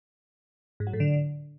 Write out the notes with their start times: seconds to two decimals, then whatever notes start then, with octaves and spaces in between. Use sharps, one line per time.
0.80 G#2
0.87 F#3
0.93 A2
1.00 D3